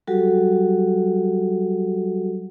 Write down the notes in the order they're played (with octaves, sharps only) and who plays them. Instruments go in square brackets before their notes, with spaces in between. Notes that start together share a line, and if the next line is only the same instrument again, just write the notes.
[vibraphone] F#3 G3 F#4 G4 A4